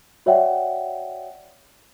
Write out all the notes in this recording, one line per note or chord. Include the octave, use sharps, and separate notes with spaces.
F#4 C#5 D5 E5 F#5 G5